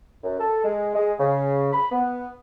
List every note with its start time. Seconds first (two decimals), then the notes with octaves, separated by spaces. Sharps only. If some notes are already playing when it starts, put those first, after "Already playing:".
0.24 F#2
0.40 A4
0.64 G#3
0.95 G#3
1.19 C#3
1.73 B5
1.92 B3